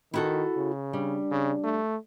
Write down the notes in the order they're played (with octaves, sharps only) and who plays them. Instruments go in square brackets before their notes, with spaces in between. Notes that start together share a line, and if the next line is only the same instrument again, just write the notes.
[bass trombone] D#3 [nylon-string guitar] E4 F#4 A4
[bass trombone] C#3
[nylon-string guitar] G3 [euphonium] D4
[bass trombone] C#3
A3